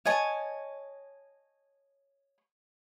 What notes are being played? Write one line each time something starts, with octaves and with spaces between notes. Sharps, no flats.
C#5 D#5 G#5 A5